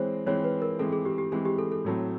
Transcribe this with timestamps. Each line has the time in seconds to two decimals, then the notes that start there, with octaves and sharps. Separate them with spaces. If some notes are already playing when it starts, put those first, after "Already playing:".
Already playing: E3 G#3 C4 C5 C#5
0.26 E3 G#3 C4 C#5
0.44 B4
0.62 A#4
0.79 E3 G#3 C4 A4
0.93 G#4
1.05 G4
1.18 G4
1.32 E3 G#3 C4 G#4
1.45 G4
1.58 A4
1.72 A4
1.85 A2 F#3 A3 C4